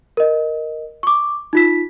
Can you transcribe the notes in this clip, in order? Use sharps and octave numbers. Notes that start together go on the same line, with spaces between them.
A#4 D#5
C#6 D6
D#4 F4 B6